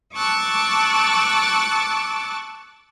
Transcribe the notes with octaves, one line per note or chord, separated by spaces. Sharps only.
A5 C#6 D6 E6 F#6 A6